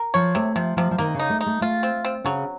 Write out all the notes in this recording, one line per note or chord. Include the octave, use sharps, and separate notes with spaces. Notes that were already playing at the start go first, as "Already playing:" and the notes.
Already playing: A#4
F3 C#5
C3 A3
C3 F3
C3 F3
F3
D#3 A#3
C#3
D#4
A3
D#4
A3
A3 F4
C4
C4
C#3 F#3